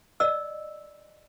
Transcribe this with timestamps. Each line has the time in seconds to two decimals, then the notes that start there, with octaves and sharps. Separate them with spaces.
0.20 D5 D#5 E6